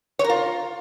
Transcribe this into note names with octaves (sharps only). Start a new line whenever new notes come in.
C#5
A#4
F4